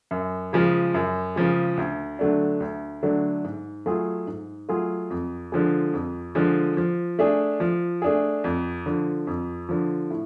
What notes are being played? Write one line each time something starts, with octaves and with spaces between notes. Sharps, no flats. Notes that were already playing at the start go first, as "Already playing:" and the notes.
F#2
C#3 F3 G#3
F#2
C#3 F3 G#3
D2
D3 F#3 A3 D4
D2
D3 F#3 A3 D4
G#2
F#3 A3 F4 G#4
G#2
F#3 A3 F4 G#4
F2
D3 F3 G#3
F2
D3 F3 G#3
F3
A3 D4 G#4
F3
A3 D4 G#4
F2
D3 F3
F2
D3 F3
A2